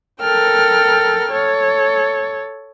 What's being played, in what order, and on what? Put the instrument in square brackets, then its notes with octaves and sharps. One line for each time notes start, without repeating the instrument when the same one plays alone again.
[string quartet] A4 A#4 G5 F6
A4 C#5